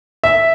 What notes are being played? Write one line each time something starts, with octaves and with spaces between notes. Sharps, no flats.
E5